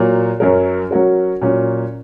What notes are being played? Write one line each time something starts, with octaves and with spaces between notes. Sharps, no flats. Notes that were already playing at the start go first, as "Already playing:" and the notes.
Already playing: A#2 F#3 A#3
F#2 F#3 C#4 A#4
F#3 C#4 F#4 A#4
A#2 F#3 C#4